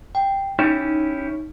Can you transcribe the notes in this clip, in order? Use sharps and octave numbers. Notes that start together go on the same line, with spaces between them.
G5
C#4 D#4 E4 G4